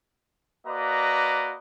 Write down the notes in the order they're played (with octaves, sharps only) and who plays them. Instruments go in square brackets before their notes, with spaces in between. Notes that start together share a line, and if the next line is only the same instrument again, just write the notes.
[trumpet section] A#3 F#4 B4 D5 D#5 A#5